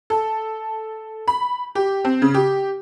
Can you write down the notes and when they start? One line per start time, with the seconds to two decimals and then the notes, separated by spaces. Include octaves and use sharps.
0.10 A4
1.28 B5
1.75 G4
2.05 C4
2.22 C#3
2.34 G4